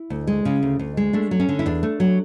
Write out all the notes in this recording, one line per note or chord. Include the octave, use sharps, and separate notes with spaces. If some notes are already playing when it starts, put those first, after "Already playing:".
Already playing: E4
D2
G#3
C#3
D2
D2
G#3
A3 D4
F#3
C#4
D3
E4
E2 D4
A3
F#3